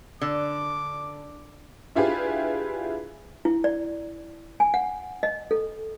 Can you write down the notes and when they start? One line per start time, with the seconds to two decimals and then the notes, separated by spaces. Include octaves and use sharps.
0.21 D3 D6
1.95 D4 E4 F4 G4 G#4 B4
3.45 E4
3.64 D5
4.60 G#5
4.74 F#5
5.23 D#5
5.51 A4